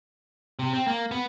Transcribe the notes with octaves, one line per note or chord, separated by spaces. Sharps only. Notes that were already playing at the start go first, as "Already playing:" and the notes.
C3
C4
A#3
B3